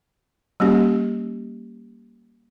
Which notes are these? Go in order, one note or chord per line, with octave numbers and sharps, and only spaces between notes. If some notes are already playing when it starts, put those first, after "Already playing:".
G3 A#3 C#4 G4